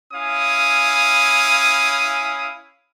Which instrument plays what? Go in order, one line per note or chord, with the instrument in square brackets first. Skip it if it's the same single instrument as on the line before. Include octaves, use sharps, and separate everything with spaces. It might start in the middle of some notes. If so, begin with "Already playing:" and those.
[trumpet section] C#4 E4 F5 G#5 D#6